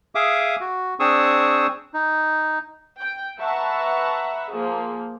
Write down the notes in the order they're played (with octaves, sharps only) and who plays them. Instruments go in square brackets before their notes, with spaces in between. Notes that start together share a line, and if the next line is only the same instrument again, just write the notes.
[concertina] G#4 E5 F5 D6 D#6
F#4
C4 D4 G#4 C#6 D#6 E6
D#4
[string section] G5
B4 E5 F#5 A5 A#5 C#6
F3 A#3 G#4